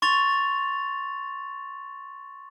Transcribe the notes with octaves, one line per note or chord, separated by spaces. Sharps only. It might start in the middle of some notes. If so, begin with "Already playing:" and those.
C6 C#6 A6 F7